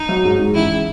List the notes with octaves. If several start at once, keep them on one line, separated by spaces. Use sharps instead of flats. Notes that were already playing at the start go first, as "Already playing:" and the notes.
Already playing: D#4
F#3
G#2
G#2
A1 E4